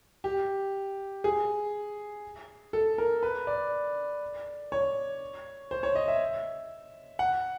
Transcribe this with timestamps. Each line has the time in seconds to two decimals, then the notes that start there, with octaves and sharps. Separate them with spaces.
0.24 G4
1.24 G#4
2.73 A4
2.98 A#4
3.23 B4
3.47 D5
4.72 C#5
5.71 C5
5.83 C#5
5.95 D#5
6.08 E5
7.19 F#5